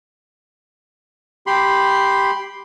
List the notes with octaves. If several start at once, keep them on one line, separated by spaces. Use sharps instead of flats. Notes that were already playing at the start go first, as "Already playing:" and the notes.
G4 B5 C6